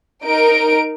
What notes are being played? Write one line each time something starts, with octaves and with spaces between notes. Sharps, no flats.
D#4 A#4 D7